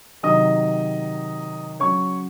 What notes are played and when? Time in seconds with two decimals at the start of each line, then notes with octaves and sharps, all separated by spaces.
0.23 C3 D#3 F#3 D#5 D#6
1.80 C#3 F#3 C#5 C#6